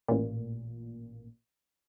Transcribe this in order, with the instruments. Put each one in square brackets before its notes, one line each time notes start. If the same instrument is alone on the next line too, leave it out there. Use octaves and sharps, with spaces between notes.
[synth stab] A1 A#2